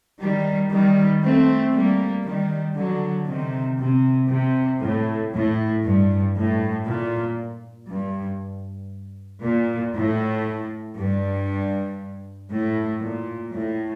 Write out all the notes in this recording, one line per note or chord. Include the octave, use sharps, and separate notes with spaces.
D#3 G3
D#3 G3
A3 C4
G3 A#3
D#3 G3
D3 F#3
C3 D#3
C3
C3
A2
A2
G2
A2
A#2
G2
A#2
A2
G2
A2
A#2
A2